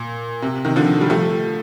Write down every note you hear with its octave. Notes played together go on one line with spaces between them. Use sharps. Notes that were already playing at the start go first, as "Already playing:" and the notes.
Already playing: A#2
C3
C3 D#3
D3 F3
G3
F3 A3